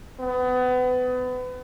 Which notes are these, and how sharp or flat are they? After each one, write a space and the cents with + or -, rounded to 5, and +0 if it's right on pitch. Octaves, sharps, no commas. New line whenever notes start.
B3 +30